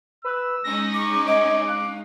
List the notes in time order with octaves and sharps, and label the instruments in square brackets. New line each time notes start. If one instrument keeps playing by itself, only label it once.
[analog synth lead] B4 [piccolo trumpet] E6
[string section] G#3 C#4 D#4 [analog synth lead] A#6
[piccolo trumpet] C#6 [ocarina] D6
[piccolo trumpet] C#5 [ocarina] D#5 [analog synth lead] D6
[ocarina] F5 [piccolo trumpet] F#6